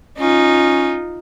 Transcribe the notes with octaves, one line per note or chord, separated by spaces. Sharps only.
C#4 D#4 F4